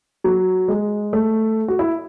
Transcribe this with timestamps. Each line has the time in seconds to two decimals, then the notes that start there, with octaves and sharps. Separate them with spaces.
0.24 F#3
0.68 G#3
1.13 A3
1.68 F#4
1.79 E4